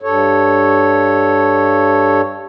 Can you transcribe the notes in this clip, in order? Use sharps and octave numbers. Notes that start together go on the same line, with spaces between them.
G2 A4 C#5